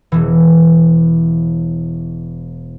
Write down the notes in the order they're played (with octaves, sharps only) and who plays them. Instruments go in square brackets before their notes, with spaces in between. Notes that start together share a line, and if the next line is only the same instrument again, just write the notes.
[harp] E1 E3